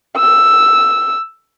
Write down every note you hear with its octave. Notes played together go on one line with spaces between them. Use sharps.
E6